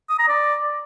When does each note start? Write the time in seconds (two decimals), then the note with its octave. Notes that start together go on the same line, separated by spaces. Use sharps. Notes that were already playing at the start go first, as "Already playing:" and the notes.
0.10 D#6
0.19 A#5
0.28 D5